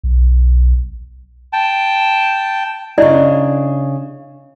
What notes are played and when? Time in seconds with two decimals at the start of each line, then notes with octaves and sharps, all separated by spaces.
0.04 B1
1.53 G5 A5
2.98 C#3 D4 E4 D5 D#5